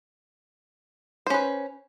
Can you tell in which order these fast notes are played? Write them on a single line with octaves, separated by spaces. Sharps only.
C5 C#4 B4